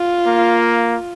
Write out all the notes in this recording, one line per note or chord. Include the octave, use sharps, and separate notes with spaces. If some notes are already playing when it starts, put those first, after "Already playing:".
Already playing: F4
A#3